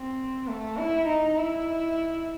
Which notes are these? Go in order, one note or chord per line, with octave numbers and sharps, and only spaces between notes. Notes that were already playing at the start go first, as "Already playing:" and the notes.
Already playing: C4
A3
E4
D#4
E4